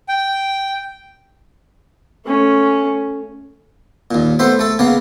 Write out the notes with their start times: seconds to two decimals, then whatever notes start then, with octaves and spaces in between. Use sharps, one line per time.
0.09 G5
2.26 A3 C#4
4.11 D#2 A#2
4.39 A3 B3 C5 E5
4.59 A3 A4
4.79 C#3 A#3 B3